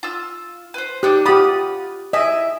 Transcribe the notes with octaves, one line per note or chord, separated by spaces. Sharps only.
F4 E6
B4 C5
D4 D#4 G4 F#6
F4 G4 F#5 B5 D#6
E4 D#5 E5 G#5